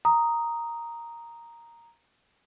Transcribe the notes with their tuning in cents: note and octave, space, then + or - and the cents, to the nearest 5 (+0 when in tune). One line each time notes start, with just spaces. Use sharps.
A#5 +0 D#6 +0